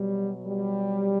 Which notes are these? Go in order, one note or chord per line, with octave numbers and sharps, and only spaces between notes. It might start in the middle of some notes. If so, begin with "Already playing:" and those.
Already playing: B2 F#3 G3
G3